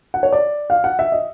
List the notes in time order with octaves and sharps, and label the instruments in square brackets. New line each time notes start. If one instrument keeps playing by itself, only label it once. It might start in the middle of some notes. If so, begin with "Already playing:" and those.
[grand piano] F#5
C#5
D5
F5
F#5
E5
D#5